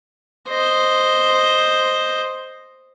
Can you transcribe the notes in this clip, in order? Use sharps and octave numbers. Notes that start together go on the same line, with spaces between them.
C5 D#5